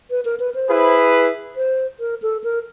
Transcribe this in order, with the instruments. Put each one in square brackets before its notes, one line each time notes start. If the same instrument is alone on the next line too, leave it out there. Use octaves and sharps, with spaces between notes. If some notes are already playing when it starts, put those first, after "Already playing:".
[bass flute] B4
A#4
B4
C5
[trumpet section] E4 G#4 B4
[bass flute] C5
A#4
A4
A#4